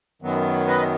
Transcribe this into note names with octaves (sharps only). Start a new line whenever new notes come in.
F#2 D#3 F#3 B3
B4 D#5